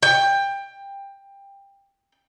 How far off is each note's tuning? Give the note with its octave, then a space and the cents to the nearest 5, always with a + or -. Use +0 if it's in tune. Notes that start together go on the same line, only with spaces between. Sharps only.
G5 +20